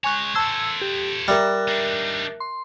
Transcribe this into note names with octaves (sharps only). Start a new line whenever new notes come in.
G#3 C#5 G#5 C#6 F#6
A4 C5 A5 E6 G#6
G4
G3 A#4 E5 F#6
D4 D#4
C6